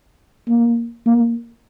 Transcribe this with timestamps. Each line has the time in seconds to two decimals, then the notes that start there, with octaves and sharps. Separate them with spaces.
0.48 A#3
1.06 A#3